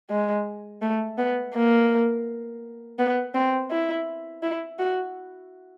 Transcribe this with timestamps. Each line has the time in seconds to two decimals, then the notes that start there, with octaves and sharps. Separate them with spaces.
0.10 G#3
0.82 A3
1.18 B3
1.54 A#3
2.99 B3
3.34 C4
3.71 E4
4.43 E4
4.79 F#4